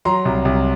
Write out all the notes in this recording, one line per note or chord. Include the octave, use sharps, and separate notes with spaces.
F#3 A#5 C6
C2
C2